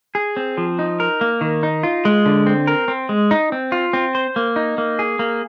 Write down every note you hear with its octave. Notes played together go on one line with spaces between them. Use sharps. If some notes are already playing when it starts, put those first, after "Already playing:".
G#4
C4
F3
D#4
A#4
A#3
D#3
D#4
F4
G#3
D3
C4
A#4
C4
G#3
D#4
C4
F4
C4
C5
A#3
D#4
A#3
G#4
A#3